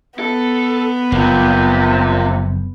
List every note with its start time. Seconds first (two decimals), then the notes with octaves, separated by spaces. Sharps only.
0.19 B3 A4
1.12 F#1 F2 C3 A#3 F4